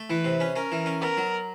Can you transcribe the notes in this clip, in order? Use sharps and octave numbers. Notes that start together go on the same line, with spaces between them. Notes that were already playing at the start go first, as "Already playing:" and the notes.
Already playing: A3
E3 B4
C3
C#4
C#4 A#4
E3
C#4
B3 A#4
F#3